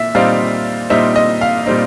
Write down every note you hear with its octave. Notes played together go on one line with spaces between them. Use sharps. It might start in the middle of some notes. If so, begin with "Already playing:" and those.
Already playing: A#2 E5
A#2 G3 C4 D#4 F5
A#2 G3 C4 D#4 E5
D#5
F5
A#2 G3 C4 D#4